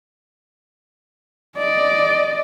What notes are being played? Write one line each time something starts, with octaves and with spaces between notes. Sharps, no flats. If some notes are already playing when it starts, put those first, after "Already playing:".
D5 D#5